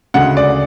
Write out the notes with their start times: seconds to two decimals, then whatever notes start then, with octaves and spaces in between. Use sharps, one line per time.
0.14 D2 C#3 G#3 F#5
0.37 D5